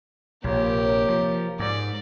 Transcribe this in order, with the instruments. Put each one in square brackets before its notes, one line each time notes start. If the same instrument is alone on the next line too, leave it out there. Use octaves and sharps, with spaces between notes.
[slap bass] A#1 [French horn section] C3 A#3 C#5 [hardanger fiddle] G4 A#4
[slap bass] F3
[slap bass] G#2 [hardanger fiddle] D5